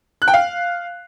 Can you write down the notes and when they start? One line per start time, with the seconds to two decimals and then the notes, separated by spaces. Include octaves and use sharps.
0.22 F#6
0.28 G5
0.34 F5